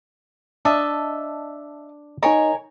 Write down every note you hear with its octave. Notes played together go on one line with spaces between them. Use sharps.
D4 D#5 E5 A5
D#4 A#4 C#5 D#5 G#5